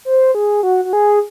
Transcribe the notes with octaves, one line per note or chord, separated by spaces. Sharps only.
C5
G#4
F#4
F#4
G#4